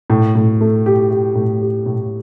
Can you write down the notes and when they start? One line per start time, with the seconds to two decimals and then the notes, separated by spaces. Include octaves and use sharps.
0.10 A2
0.35 A2
0.61 A3
0.86 G4
1.11 G4
1.35 A2
1.61 G4
1.86 A2